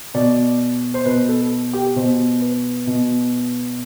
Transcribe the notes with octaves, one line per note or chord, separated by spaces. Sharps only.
B2 D5
C5
B2 B4
A4
G4
B2 C5
B4
B2